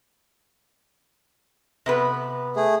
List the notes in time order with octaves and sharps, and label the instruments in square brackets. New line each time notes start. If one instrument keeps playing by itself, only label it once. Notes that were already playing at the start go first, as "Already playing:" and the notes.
[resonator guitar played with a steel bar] C3 B3 B4
[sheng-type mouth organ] A3 G#4